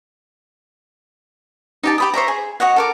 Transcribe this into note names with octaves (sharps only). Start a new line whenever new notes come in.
D#4 G4 A5
G4 B5 D#6
C5 C#5 E5 A#5
G#4
F#4 C#5 D#5 F#5
A4 A#4 D6